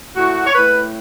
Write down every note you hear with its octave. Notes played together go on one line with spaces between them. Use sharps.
A2 F#4
C#5
A2 B4